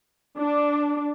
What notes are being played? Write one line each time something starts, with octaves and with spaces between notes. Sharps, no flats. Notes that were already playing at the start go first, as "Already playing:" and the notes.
D4